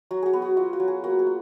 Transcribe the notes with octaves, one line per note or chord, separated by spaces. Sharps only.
F#3 F#4
F#4 G#4
B3
F#4
F4 F#4
F#4
F#3
G#4
A#3 F#4
G#4
F4